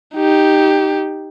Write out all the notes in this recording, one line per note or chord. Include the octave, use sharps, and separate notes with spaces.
D#4 G4